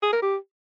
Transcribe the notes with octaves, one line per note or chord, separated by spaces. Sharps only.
G#4
A#4
G4